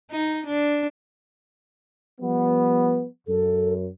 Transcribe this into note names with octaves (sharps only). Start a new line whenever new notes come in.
D#4
D4
F3 G3 B3
F#2 A4